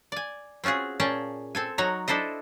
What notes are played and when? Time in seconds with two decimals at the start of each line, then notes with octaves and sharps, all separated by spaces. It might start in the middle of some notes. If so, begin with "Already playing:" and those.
0.12 D5 G#5
0.64 C4 C#4 F4 F#4 G#4
1.00 A#2 C#4 G#4 G5 A5
1.55 C4 A4 G#5
1.78 F#3 D#4 F#4 C#5 A#5
2.08 D4 E4 A4 C5 D#5